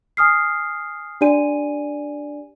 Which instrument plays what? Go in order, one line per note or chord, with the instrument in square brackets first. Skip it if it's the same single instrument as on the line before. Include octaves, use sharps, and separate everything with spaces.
[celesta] G#5 D#6 F6 C7
D4 G4 D5 G#5 D#7